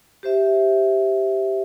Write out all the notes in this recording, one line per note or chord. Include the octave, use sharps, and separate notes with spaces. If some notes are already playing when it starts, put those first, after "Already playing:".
G4 C5 E5